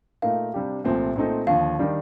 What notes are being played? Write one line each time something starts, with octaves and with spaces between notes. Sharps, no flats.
A#2 A3 D#4 A#4 F5
C3 G3 D4 G4
C2 A#2 F3 A3 C4
A#2 A3 C4 D#4 A4
D#2 D3 F3 F5
D#3 G3 D4